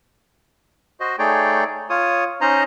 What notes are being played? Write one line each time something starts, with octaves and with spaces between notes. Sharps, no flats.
F#4 C5 D#5
A3 D#4 G#4 C#5 D5 G5
F4 C#5 D#6
C#4 D#4 C5 D#5 A#5